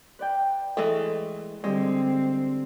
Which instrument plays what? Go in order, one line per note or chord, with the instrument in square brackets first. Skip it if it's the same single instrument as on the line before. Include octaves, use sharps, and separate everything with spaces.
[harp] B4 D5 G5
[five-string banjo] E3 G#3 A3
[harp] D3 G3 [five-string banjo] G#3 [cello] C4